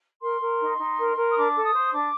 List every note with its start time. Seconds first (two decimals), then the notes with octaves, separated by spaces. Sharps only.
0.21 A#4 C6
0.40 A#4
0.59 D#4
0.78 D#4
0.98 A#4
1.16 A#4
1.29 D#6
1.35 D4 D6
1.55 A4
1.64 D#6
1.73 C5
1.92 D4 D6